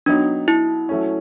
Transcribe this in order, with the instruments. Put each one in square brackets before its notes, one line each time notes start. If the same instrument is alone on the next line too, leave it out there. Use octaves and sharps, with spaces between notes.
[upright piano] F#3 B3 D#4 [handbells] D4
[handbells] E4
[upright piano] F#3 A3 C#4